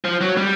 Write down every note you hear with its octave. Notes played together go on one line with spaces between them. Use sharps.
F3
F#3
G3